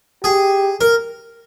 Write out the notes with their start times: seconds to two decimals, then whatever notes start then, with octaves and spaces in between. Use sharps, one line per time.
0.24 G4 G#4
0.81 A#4